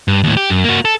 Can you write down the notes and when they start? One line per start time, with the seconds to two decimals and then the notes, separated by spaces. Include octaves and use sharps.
0.08 G2
0.24 D#2 A2
0.37 G4
0.50 F#2
0.64 A#3 F#4
0.85 A4